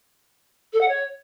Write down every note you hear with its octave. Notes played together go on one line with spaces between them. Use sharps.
A4
F#5
C#5